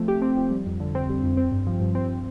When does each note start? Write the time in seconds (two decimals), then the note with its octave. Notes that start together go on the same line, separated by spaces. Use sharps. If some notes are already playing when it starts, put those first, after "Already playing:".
Already playing: F3 A3 C4
0.08 G4
0.22 C4
0.37 F3
0.51 G3
0.66 F2
0.80 D3
0.95 C4
1.09 G3
1.24 F2
1.37 C4
1.52 G2
1.67 F3
1.81 G2
1.95 C4